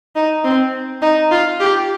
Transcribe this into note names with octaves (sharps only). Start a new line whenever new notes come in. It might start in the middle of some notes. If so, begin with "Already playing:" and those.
D#4
C4
D#4
F4
G4